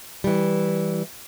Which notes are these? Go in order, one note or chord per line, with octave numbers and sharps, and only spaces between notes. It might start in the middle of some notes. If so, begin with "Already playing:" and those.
E3 G3